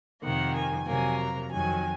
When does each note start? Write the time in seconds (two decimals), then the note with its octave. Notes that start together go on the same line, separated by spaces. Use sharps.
0.22 F2 C3 D#3 A#3 F#5
0.54 G#5
0.86 F2 C3 F#3 A#3 G#5
1.18 A#5
1.50 F2 D#3 F#3 G#5